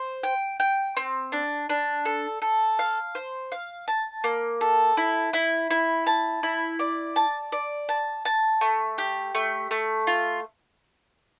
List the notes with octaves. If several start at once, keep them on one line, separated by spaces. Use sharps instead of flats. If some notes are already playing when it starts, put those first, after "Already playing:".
Already playing: C5
G5
G5
C4
D4
D4
A4
A4
F5
C5
F5
A5
A#3
A4
E4
E4
E4
A5
E4
D5
A5
D5
A5
A5
A3
G4
A3
A3
F4